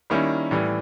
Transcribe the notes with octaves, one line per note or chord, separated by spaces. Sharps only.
D#3 G3 A#3 C#4 E4
A2 E3 G3